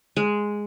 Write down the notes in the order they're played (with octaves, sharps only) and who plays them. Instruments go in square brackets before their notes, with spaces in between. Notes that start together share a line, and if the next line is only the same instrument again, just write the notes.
[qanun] G#3